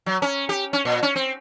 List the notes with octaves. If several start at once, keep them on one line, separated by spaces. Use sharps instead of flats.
F#3
C#4
G4
C#4
A#2
C#4
C4